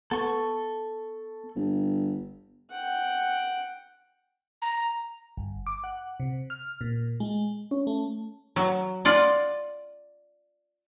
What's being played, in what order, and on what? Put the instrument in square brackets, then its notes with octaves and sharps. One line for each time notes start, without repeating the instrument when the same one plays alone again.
[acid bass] B3 [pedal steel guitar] A4 C#6
[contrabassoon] G1
[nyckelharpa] F#5 G5
[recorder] A#5
[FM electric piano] G1
D6
F#5
C3
F6
A#2
G#3
C#4
A3
[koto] F#3
F4 D5 F#5